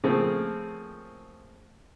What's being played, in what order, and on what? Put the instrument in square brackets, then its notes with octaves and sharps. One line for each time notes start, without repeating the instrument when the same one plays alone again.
[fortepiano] C#3 F3 A3 A#3 C4